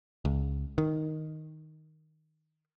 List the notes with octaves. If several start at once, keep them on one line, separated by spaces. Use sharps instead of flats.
C#2
D#3